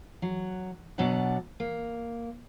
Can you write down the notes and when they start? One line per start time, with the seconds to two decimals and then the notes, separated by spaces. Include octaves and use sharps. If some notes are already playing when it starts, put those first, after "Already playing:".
0.22 F#3
0.98 B2 F#3 D4 D5 F#5
1.60 A#3